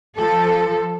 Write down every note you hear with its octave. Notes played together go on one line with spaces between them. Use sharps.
F3 A4